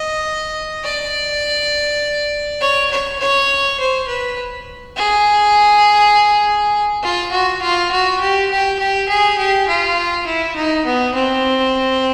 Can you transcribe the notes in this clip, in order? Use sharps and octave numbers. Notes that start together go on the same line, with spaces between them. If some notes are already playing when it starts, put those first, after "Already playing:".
Already playing: D#5
D5
C#5
C#5
C#5
C5
B4
G#4
F4
F#4
F4
F#4
G4
G4
G4
G#4
G4
F4
E4
D#4
B3
C4